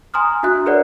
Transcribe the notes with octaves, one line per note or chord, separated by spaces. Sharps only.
G#5 A#5 C6 D#6 F6
D4 F#4 E5 F#6
G#4 A#4 B4 C#5 D5 F#5